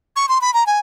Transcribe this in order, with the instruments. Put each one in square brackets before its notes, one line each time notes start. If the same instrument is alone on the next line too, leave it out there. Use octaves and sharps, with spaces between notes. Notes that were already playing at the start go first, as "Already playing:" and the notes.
[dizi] C#6
C6
B5
A#5
G#5